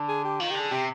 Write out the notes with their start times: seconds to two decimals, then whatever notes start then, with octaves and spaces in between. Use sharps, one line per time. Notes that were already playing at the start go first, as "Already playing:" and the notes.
Already playing: D3
0.08 G#4
0.24 G4
0.40 D#3 F4
0.51 D3 G4
0.60 G#4
0.71 C3 G4